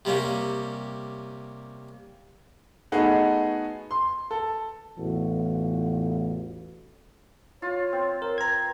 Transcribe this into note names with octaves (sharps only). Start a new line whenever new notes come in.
C3 G3 A#3 C#4
A3 B3 D#4 F#4 G#4
C6
A4
A1 E2 F4 F#4
F4 C#5
C4
A#4
B4 A#5 G#6